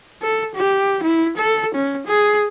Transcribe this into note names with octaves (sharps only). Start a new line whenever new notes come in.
A4
G4
E4
A4
C#4
G#4